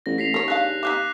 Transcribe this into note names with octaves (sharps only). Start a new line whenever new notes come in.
A1 A#6
A1 B6 C7 F7
D#2 A#4 C#5
G#3 D4 F5 F#6
D#4 G4 F5 D6 F#6 B6